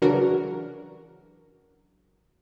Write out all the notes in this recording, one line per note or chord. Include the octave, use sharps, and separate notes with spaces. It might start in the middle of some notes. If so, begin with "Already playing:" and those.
C#3 E3 F#3 D4 F#4 A#4